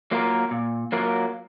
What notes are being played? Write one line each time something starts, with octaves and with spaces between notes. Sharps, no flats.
F#3 A#3 F4 A#4
A#2
F#3 A#3 F4 A#4